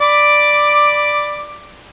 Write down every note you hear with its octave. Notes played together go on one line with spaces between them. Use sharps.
D5 B5 D6